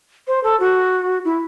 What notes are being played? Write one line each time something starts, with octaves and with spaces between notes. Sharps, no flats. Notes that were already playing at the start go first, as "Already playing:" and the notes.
C5
A4
F#4
E4